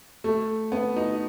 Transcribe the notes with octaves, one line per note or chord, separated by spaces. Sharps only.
A3
B3
D#4